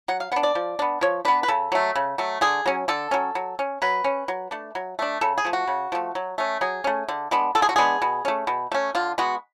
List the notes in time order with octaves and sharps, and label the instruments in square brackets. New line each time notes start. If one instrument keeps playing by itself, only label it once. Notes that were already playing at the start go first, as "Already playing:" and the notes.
[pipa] F#3 F#5
F5
B3 D4 F#5
D5
F3
B3 D4
F3 C#5
B3 D4 B4
B4
C#3 A4
F#3 A3
C#3
F#3 A3
D3 G#4
F#3 C#4
D3 A4
F#3 C#4
F#3
C#4
F#3 B4
C#4
F#3
A3 D4
F#3
A3 D4
C#3 A4
G#4
F3 A3
F#4
C#3
F3 A3
F#3
A3 C#4
F#3 G#4
A3 C#4
D3
G#3 B3 D4
D3 A4
G#4
F#4
G#3 B3 D4 G#4
B2
A3 C#4
B2
A3 C#4
D3 F4
G#3 B3 F#4